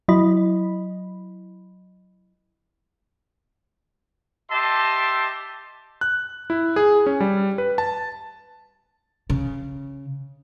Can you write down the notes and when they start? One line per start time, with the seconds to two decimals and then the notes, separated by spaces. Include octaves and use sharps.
0.08 F#3 E4 D#5 B5
4.51 G4 D#5 E5 A5 C6
6.01 F#6
6.50 E4
6.76 G#4
7.06 C#4
7.20 G3
7.58 B4
7.78 A5
9.30 C#3